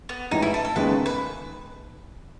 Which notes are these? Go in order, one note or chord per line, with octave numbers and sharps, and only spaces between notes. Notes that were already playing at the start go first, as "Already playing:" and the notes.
B3
A1 G#2 E3 D#4
E4
A4
A4
D#2 C#3 G#3 B3 B4
B4